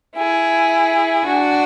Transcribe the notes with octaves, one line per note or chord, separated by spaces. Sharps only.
E4 G#4
D4 F#4